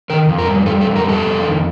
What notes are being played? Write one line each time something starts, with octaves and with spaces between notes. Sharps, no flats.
D#3 A#4
F2
A#4
G3
G3 A4
A4
F2
A#4
G3 A4
F2
D#3